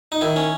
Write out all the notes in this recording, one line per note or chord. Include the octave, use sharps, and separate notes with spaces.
D#4
D#3 E4
C#4